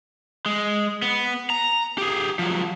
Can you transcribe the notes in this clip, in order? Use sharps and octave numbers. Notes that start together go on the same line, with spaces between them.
G#3
B3
A#5
G4 G#4
F3 F#3